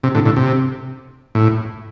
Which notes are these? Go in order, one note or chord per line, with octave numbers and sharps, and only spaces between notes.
C3
A2 D3
A2 D3
C3
A2